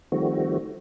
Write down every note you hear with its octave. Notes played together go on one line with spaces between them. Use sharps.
D#3 F3 G3 A3 C4 F#4